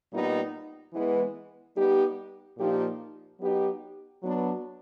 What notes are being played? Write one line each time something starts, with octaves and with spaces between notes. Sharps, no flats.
A#2 G3 B3 D#4
E3 G#3 B3
G3 B3 D#4 G4
A#2 F3 A#3 D#4 G4
F#3 B3 D#4 G4
F#3 B3 D4